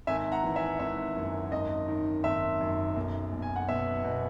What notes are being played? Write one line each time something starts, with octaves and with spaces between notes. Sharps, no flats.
G#1 E5 G#5
F#5 A#5
E3
E5 G#5
G#1 E5
F#2
G#1 D#5
D#3
G#1 E5
F#2
B1
B1
G#5
F#5
B2 E5
B2